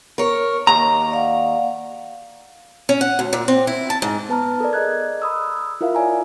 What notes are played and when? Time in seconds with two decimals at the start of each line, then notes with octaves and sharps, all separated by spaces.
0.18 A#4 C#5
0.67 D#2 A#5
1.11 D5 F5 F#5
2.89 C#4
3.01 F#5
3.19 D2
3.33 A#2
3.48 C4
3.67 E4
3.90 A5
4.02 G#2
4.29 B3 B4 A5 A#5 F6
4.60 A4 A#4 D5
4.73 G#4 D5 D#5 A#5 F#6 G#6
5.22 A#5 B5 D#6 E6
5.81 E4 F4 A#4 E5 F5
5.95 C#5 D5 G#5 A#5